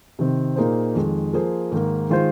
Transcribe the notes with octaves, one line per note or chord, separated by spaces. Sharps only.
C3 D#3 C4
A#2 A#3 D#4 G#4 C5
F2 D#3 G#3
F3 A#3 G#4 C5
G#2 D#3 A#3
D#3 G#3 F4 C5